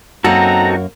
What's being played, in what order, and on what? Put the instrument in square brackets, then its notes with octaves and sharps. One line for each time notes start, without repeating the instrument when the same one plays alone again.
[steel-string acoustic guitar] F#2 A#3 [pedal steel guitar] C4 D#4 A4 [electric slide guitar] F#4 [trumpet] A#5